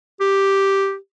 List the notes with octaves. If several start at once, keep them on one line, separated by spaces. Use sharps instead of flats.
G4